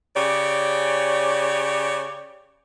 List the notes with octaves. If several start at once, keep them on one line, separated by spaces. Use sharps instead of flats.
C#3 G4 C#5 D5